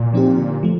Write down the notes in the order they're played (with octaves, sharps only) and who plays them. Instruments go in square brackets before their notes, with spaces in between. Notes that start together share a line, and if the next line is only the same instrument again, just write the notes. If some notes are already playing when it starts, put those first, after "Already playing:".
Already playing: [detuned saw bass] A#2
[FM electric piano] F3 C4 D#4 G4
D3
F3 A3